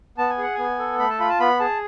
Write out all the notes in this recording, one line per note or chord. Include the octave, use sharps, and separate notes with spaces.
B3 A5
G#5
G#4 F#5
B3 G#5
A4
A3 B5
A5
F4 B5
A5
B3 B5
G#4 A5